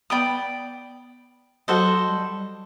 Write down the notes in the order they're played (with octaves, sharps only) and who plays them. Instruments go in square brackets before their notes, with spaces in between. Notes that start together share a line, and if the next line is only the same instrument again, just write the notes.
[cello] B3 [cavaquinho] D5 G5 B5 D#6
[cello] F#3 [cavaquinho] F#4 A4 C5 D#5
[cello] G3